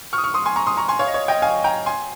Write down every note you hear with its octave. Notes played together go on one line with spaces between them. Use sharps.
C#6 F6
D#6
C#6 F6
C6 D#6
G#5 C6
A#5 C#6
C6 D#6
A#5 C#6
G#5 C6
C#5 F5
D#5
C#5
D#5 G5
F5 G#5
G5 A#5
G#5 C6